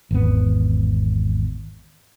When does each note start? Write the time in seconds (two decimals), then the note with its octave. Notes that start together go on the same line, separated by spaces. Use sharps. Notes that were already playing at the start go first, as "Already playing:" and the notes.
0.11 G#1 E2 B3